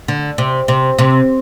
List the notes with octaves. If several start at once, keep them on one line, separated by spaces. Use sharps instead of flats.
D3
C3
C3
C3